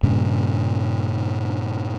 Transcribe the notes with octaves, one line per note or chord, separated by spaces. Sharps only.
G2 A#2 C#3